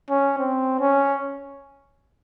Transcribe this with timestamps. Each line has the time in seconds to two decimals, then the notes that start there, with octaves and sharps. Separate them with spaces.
0.10 C#4
0.38 C4
0.80 C#4